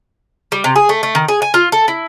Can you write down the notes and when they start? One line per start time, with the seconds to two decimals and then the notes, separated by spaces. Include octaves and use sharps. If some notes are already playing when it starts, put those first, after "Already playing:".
0.52 G3
0.64 C3
0.76 G#4
0.89 A3
1.03 A3
1.15 D#3
1.28 G#4
1.42 G#5
1.54 F4
1.72 A4
1.88 E4